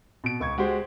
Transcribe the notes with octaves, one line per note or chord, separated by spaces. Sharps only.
B2 D7
C#2 C#6 G#6
G#3 F#4 G4 C5